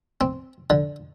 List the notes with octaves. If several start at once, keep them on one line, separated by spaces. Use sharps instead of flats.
C4
D3